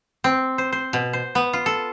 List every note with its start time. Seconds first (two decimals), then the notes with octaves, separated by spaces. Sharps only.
0.24 C4
0.58 C5
0.72 C5
0.93 B2
1.13 C5
1.35 B3
1.53 F4
1.66 A4